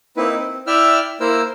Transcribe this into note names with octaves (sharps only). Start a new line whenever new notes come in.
A#3 C4 D#4 E4 B4
C4
E4 D5 E5 G5 E6 F6
A#3 E4 A#4 C5 E6